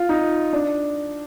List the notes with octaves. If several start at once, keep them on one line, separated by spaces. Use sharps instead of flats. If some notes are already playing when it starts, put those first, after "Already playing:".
Already playing: F4
D#4
D4